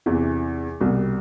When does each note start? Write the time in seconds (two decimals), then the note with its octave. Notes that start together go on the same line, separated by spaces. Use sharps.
0.06 E2 C3 E3
0.80 C2 B2 G3